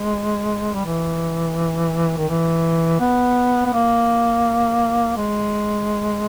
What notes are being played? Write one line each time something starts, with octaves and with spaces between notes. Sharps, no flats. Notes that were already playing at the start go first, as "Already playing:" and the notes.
Already playing: G#3
G3
E3
D#3
E3
B3
B3
A#3
G#3